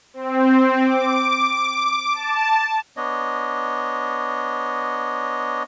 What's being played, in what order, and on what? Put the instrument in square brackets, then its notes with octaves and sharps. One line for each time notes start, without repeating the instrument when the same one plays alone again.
[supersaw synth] C4
D6
A5
[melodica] B3 D4 C#5 D#5